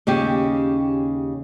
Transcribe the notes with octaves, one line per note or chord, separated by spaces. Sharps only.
D#2 C#3 C#4 G4